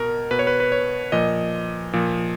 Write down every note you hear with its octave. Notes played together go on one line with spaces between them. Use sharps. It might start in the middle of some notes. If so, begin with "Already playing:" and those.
Already playing: B2 A#4
B2 B4
C#5
B4
B4
C#5
A#2 F3 D#5
A#2 F3